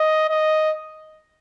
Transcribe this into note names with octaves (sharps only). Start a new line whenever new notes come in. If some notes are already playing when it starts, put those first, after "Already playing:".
Already playing: D#5
D#5